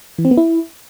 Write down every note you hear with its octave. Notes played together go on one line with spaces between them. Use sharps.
E3
C4
B3
E4